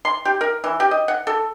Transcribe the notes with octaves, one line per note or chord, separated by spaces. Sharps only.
C6
G4
A#4
E3
G4
D#5
F#5
A4